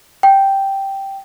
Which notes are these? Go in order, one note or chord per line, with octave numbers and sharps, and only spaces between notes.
G5